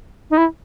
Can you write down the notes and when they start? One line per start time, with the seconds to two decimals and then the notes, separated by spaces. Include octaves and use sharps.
0.30 D#4
0.37 E4